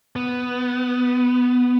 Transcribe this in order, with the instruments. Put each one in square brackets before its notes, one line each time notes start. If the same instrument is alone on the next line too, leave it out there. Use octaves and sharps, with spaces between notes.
[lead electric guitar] B3